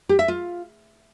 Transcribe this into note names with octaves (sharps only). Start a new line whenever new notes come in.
G4
E5
F4